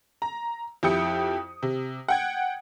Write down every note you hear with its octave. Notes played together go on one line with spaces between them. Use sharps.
A#5
F2 E4 G4 G5 D#6 C#7
C3
F#5 G5 G#6